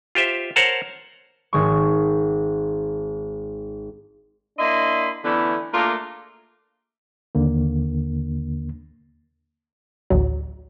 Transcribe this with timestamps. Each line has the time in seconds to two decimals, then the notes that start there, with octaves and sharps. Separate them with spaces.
0.15 F4 G4 C5 E5
0.56 A#4 C5 C#5 F#5 A5
1.53 G#1 G#3 C#6
4.58 A#3 D4 E4 D#5 B5 C6
5.24 D3 E3 A3 B3 C#4 E4
5.73 A3 A#3 D4 F4 G#4 A#4
7.35 D#2 D3 A#3
10.10 A1 D2 F#3